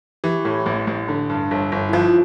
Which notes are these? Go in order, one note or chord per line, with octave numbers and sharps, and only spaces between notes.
E3 G4
A2
A1
A1
D3
G2
G1
G1
E4
F3 F4